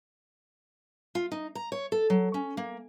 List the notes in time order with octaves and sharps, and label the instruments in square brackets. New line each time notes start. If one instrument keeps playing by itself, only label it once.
[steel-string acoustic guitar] F4
D#4
A#5
C#5
A4
F#3
C#4
A#3